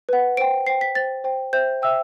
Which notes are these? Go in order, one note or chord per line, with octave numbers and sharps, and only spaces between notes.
B4 F#5
C5 G5 D7
C5 G5 C7
B6
C5 G5 A6
C5 G5
C5 E5 G5 G6
C5 E5 G5 E6